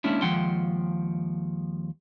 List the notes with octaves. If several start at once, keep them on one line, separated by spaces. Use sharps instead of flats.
G#3 A#3 C#4 D4 E4
D#2 F3 G#3 F#5 G5 C6